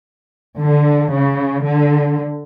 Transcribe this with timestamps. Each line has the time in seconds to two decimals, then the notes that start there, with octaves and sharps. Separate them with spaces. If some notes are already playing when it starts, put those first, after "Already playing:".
0.58 D3
1.11 C#3
1.62 D3